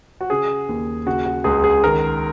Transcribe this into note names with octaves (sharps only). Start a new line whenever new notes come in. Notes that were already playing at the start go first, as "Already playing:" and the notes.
F#4
C#3 G#4
D#2
C#3 F#4
F#4
C#2 G#4
G#4
D#3 A#4